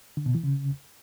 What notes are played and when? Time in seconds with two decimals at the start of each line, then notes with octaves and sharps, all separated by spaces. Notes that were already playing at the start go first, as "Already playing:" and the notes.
0.17 D3
0.26 B2
0.35 E3
0.44 C#3